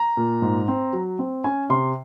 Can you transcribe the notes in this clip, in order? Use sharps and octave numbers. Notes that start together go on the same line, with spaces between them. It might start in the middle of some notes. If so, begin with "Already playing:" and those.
Already playing: A#5
A#2
G#2
C4
F#3
C4
C#4 G#5
C3 C6